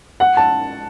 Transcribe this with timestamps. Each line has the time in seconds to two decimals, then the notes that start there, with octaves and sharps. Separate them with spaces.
0.20 F#5
0.37 A5